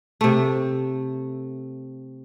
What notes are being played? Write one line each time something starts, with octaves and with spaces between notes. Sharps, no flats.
C3 A3